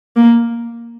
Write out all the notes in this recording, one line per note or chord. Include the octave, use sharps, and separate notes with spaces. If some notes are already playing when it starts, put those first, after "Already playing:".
A#3